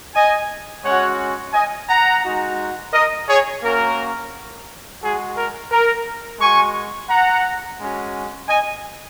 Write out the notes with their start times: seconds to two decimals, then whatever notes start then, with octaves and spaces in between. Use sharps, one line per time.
0.15 D#5 G#5
0.84 G#3 C#4 F#4 C#5 F#5
1.54 D#5 G#5
1.89 F#5 A#5
2.24 G#3 D#4 F#4
2.93 A#4 D#5
3.28 G#4 C#5
3.62 A#3 C#4 F#4 A#4
5.01 G#3 F#4 G#4
5.36 A#4
5.71 A#4
6.40 G#3 F#4 G#5 C#6
7.10 F#5 A#5
7.79 G#3 C#4 F#4
8.49 D#5 G#5